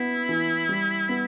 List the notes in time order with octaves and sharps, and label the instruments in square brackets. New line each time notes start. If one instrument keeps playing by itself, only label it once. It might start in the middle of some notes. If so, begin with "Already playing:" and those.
Already playing: [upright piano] B3 [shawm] E4
[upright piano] E3
G3
B3